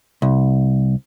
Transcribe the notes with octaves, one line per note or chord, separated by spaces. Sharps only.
C2